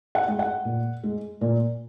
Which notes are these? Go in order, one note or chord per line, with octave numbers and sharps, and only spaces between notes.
F#5
G#3
F#5
A#2
G#3
A#2